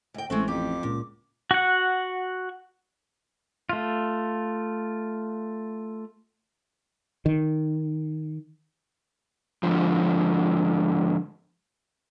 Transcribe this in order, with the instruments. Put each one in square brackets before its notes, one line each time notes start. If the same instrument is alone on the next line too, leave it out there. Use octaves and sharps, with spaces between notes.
[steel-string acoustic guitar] D2 G5 [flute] D#5
[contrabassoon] A1 [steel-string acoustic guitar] G#3 A3 C4 [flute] C#6
[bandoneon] F2 [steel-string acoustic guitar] G4 [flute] D6
[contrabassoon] C#2 [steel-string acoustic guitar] A#2
[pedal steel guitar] F#4 F#5
A3 F4
[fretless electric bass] D#3
[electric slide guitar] G#2 D3 F3